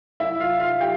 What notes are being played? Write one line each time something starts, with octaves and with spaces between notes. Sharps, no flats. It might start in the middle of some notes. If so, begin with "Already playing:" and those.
E4 E5
F4 F5
F4 F5
G4 G5